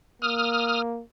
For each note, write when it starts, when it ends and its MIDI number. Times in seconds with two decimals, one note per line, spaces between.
0.22 1.02 58
0.22 0.82 87
0.22 0.82 89